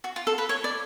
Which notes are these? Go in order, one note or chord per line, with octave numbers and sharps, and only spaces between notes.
F#4
F4
A4
B4
C#5
D5